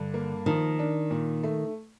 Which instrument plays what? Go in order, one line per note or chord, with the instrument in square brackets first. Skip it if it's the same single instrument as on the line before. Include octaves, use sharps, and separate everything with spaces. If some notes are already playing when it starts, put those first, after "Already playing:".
Already playing: [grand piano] G2 [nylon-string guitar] D3
[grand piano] A#3
[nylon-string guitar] D#3 [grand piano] F3
[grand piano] D4
A#2
A3